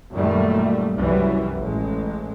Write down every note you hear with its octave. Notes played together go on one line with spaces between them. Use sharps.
F#2 A#2 D#3 G3 A3
C2 F#2 E3 F#3 G3
A1 G#3